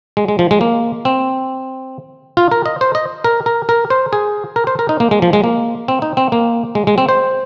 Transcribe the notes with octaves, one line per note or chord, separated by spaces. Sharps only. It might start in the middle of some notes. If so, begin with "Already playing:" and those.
G#3
G#3
F3
G#3
A#3
C4
F4
A#4
D#5
C5
D#5
A#4
A#4
A#4
C5
G#4
A#4
C5
A#4
D#4
A#3
G#3
F3
G#3
A#3
C4
D#4
C4
A#3
G#3
G#3
C4
C5